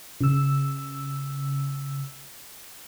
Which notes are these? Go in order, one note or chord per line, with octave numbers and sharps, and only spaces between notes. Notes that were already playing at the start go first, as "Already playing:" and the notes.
C#3 E6